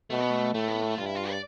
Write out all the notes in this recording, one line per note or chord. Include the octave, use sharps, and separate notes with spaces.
B2 A3
B3
A3
A2 A3
B3
A3
G2 F4
E4
F4
D5